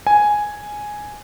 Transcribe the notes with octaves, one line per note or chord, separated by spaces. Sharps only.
G#5